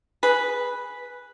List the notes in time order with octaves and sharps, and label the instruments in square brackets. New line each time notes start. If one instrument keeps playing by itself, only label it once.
[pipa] G#4 B4